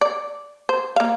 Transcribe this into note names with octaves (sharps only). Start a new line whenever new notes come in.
D5
C5
A#3 F5